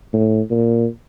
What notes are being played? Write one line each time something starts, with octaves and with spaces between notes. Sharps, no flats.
A2
A#2